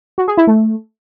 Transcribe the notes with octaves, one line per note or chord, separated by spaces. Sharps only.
F#4
G#4
E4
A3